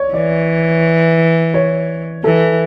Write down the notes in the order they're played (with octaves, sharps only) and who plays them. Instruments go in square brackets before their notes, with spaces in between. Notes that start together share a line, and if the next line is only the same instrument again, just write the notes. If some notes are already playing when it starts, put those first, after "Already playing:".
Already playing: [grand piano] C#5 D5
[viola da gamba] E3 [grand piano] D5
[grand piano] C#5
[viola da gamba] E3 [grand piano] A4